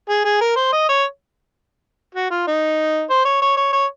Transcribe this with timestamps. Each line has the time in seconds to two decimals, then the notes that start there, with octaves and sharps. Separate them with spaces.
0.09 G#4
0.24 G#4
0.41 A#4
0.56 C5
0.72 D#5
0.89 C#5
2.15 F#4
2.31 F4
2.47 D#4
3.10 C5
3.25 C#5
3.42 C#5
3.57 C#5
3.73 C#5